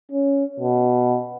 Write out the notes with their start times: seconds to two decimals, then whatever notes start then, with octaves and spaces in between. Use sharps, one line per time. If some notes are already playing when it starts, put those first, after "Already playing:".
0.11 C#4
0.60 B2